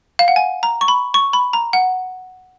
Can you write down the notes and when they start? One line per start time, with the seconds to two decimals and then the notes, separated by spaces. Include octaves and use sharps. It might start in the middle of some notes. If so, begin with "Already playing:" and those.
0.19 F5
0.28 F#5
0.36 G#5
0.63 A#5
0.81 C#6
0.88 B5
1.14 C#6
1.33 B5
1.53 A#5
1.73 F#5